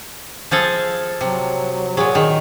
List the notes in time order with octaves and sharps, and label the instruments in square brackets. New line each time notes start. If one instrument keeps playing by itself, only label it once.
[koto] F3 G#4 A4
[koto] C3 [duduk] F#3
[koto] A#2 F#3 [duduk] G#4
[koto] D#3